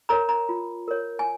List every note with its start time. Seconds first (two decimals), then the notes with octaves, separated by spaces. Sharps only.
0.09 A#4 C#5 A#5
0.29 A#5
0.49 F4
0.88 A#4 C#5
1.19 G#5